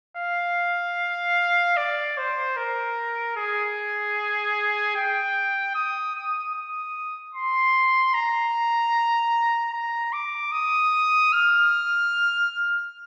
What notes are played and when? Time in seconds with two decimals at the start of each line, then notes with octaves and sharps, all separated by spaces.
0.17 F5
1.77 D5
2.18 C5
2.57 A#4
3.37 G#4
4.96 G5
5.75 D#6
6.15 D#6
6.55 D#6
7.35 C6
8.14 A#5
9.73 A#5
10.13 D6
10.52 D#6
11.33 F6